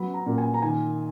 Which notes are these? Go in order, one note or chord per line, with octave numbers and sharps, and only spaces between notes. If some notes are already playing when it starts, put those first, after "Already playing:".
Already playing: F#3 B3 B5
A#5
A#2
G#5
A#5
D#3 G#5